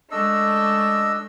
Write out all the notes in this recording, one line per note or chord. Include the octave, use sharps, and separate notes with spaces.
G#3 A3 D4 D#5 E6